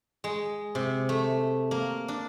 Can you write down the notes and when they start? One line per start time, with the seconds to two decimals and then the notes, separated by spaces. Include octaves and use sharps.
0.24 G#3
0.75 C3
1.09 A3
1.71 A#3
2.08 D4